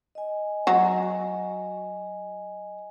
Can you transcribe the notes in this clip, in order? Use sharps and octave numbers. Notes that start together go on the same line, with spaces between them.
D#5 G#5
F#3 F#4